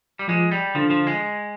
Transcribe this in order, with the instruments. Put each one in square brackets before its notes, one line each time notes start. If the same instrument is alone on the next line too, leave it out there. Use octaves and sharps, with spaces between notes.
[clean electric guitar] G3
[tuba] F3 [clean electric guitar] G#3
[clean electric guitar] G3
[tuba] D3 [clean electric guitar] F3
[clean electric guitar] F3
G#3